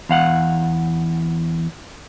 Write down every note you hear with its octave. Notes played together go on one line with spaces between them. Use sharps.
E2 F5 F#5